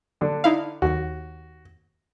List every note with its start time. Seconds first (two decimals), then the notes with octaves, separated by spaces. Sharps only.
0.21 D3 D4
0.44 D#4 E4 F5
0.82 D#2 F#4